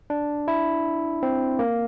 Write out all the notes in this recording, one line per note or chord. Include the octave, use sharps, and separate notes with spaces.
D4
E4
C4
A#3